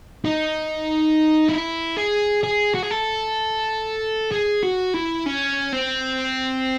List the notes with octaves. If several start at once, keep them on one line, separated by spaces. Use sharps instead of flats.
D#4
E4
G#4
G#4
F#4
G#4
A4
G#4
F#4
E4
C#4
C4